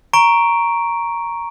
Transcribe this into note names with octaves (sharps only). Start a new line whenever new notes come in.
A#5 C#6 D7